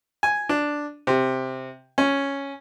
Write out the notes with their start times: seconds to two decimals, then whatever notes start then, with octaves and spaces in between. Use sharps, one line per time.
0.23 G#5
0.49 D4
1.07 C3
1.98 C#4